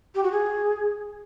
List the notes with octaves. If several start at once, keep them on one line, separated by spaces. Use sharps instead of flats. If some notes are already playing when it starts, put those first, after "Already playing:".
G4
F#4
G#4